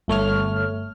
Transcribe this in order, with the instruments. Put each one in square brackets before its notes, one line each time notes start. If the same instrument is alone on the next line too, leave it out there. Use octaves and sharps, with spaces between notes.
[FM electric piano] G1 A3 C#5 F6